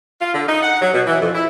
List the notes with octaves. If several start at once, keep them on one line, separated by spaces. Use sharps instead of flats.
F4
D3
D#4
F#5
F#3
B2
E3
F2
E4